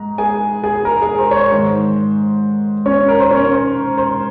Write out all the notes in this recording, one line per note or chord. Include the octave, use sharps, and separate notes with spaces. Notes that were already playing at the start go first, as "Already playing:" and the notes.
Already playing: G#2 A#5
G#4 G#5
G#4 G#5
A#4 A#5
G#4 G#5
C5
C#5
C5
G#2 D#3
C#4 C#5
A#4
C5
C#4 C#5
C5
C5